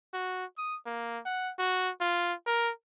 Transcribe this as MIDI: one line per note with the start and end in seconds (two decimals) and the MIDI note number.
0.14 0.45 66
0.58 0.77 87
0.86 1.19 58
1.25 1.52 78
1.59 1.91 66
2.00 2.33 65
2.46 2.71 70